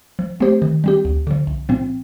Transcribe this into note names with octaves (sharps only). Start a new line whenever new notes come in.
F3
A3 C4 G4 C5
D#3
G3 C4 G4
D2
D3 F3
C2
A#2 F3 C4